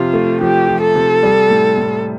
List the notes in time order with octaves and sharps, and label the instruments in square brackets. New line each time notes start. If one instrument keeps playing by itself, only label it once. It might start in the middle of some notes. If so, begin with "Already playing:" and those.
Already playing: [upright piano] C3 F3 [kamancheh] F4
[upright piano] A3
[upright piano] F3 [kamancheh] G4
[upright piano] F3
[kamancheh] A4
[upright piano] C3
G3
A2
A2